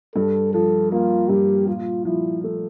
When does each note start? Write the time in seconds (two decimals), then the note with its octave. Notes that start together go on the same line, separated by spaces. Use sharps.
0.15 G2 A4
0.53 F3 A4
0.92 A#3 F4
1.29 G2 G4
1.67 A#2 F4
2.05 F3 E4
2.44 A3